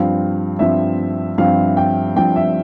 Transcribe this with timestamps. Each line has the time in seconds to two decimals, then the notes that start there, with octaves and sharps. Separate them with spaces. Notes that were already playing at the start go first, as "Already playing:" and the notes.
Already playing: G2 F3 C4 F5
0.59 G2 F3 C4 E5
1.38 G2 F3 C4 F5
1.77 G5
2.16 G2 F3 C4 G5
2.36 E5